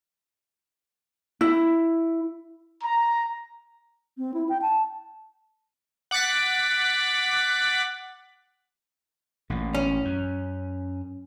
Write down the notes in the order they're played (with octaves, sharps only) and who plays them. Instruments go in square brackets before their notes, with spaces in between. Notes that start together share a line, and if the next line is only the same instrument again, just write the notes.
[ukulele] E4
[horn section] A#5
[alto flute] C4
E4
G5
A5
[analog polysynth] F#5 D6 F#6 A6 B6
[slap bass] A1 A#2
[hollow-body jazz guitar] C#4
[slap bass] F#2